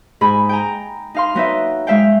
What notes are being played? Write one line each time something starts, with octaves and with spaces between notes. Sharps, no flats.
G#2 G#4 B5
G5 G#5 A#5
D#4 F5 C6
F#3 B3 D#4 B4 E5
G#3 E5 F5 G5